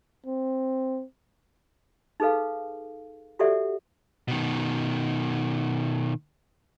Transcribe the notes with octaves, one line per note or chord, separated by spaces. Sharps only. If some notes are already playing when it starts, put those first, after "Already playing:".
C4
D#4 G#4 A4 B4 F5
F#4 G4 A4 D5 E5 F#5
B2 D#3